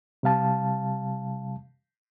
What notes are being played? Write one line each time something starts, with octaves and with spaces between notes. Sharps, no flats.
C3 G3 F5 A5